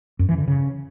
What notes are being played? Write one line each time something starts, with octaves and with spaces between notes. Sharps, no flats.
F#2
E3
D3
C#3